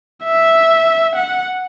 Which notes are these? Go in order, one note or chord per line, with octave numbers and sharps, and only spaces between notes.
E5
F#5